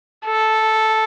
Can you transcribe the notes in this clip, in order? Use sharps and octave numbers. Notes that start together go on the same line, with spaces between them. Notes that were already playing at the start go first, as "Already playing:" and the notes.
A4